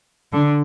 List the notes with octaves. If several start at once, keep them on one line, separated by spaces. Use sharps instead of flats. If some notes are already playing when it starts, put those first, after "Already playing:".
D3